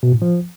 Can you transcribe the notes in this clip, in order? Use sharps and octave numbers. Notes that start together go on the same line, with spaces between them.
B2
A2
F3